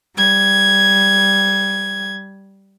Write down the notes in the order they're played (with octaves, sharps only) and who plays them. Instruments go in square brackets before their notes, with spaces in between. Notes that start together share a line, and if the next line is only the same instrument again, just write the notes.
[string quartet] G3 G#6